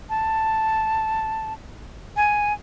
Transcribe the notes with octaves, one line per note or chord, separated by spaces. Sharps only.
A5
G#5